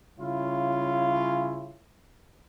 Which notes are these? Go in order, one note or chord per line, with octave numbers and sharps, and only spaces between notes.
C#3 G3 C#4 E4 F4